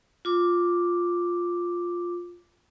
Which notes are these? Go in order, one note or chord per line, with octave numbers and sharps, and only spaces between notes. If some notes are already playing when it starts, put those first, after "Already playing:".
F4 D6